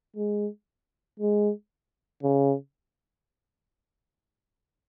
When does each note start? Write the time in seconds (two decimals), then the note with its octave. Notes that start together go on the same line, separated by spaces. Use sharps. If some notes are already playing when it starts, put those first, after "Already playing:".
0.16 G#3
1.19 G#3
2.23 C#3